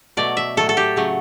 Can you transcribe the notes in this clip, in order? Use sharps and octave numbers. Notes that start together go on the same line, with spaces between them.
B2 F#3 A3 D5
E5
A2 F#3 A3 A4
A4
G4
C#3 F#3 A3